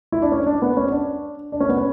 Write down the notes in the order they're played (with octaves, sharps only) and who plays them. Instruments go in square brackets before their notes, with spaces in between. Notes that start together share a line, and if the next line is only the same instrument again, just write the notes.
[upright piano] E4
D4
C#4
D4
B3
C#4
D4
D4
C#4
B3
C#4